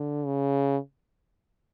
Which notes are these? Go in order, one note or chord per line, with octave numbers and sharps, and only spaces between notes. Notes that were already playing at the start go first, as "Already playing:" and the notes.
Already playing: D3
C#3